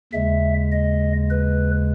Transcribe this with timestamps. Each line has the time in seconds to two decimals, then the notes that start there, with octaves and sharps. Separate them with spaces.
0.13 D#2 C#3 G#3 E5
0.72 D#5
1.30 B4